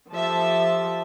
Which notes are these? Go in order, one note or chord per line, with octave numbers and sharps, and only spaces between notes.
F3 G4 A4 E5 A5